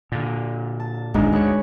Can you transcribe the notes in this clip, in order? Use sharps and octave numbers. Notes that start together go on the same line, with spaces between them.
A#2 D3
A5
D1 G#1 F#2 G#3 D4 D#4
D2 B4 C#5